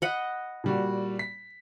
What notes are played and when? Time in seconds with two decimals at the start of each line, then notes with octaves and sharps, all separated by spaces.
0.02 D#5 F#5 B5
0.64 A#2 G3 F#4
1.19 B6